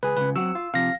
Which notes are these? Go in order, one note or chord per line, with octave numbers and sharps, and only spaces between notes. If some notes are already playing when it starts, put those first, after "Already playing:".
C#2 G#4 B4
C#2 C#3 B4
F#3 C4 F#4 E6
F4
C3 F3 F5 A#6